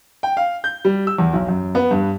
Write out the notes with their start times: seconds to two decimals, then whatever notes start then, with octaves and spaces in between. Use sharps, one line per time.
0.23 G5
0.37 F5
0.64 G6
0.85 G3
1.07 E6
1.18 E2
1.33 B1
1.48 F#2
1.75 B3
1.91 G2